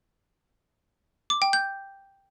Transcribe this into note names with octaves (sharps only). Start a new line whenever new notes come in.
D6
G5
G6